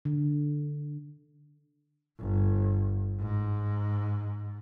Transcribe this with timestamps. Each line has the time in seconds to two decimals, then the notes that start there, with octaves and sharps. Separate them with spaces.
0.05 D3
2.19 G1
3.20 G#2